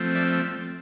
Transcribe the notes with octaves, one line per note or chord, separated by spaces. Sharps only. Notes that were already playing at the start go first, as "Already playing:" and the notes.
Already playing: F3 A3 C4
D5 E5